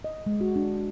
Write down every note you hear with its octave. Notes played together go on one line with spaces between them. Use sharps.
D#5
G#3
F#4
D4